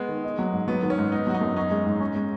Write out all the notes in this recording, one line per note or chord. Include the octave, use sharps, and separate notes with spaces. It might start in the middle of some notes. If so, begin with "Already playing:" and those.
Already playing: G#3 B3
D#3
D#4
F#3
G#2
F#3 B3
D#3
C#4
G#2
B3 D#4
F#3 F#4
D#4
F#2
C#4 D#4
G#3
G#2
C#4
G#3